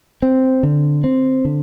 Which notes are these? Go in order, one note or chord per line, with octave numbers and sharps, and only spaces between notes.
C4
D3
C4
D3